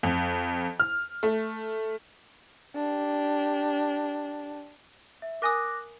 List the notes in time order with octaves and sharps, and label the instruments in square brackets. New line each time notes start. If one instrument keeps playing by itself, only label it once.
[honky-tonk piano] F2
F6
A3
[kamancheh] D4 G4
[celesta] E5
[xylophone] A#4 G#5 D#6 [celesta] D6 F#6 A#6